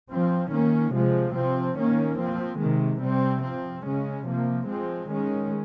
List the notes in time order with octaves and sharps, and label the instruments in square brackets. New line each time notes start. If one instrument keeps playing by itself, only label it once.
[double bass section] F3 C4
D#3 A#3 C#4
C3 F3 G#3
C3 F3 C4
D#3 A#3 C#4
F3 C4
C3 D#3 G#3
C3 G3 C4
F3 C4
C#3 G#3 C#4
C3 F3 A#3
F3 G#3 C4
D#3 G#3 C#4